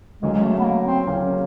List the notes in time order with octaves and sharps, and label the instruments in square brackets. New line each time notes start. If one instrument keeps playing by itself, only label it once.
[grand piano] D2 C#3 F#3 A#3 C#4 [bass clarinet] G#3
[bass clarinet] G#3
A3
B3
A#3
C4
[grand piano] D2 C#3 F#3 A#3 C#4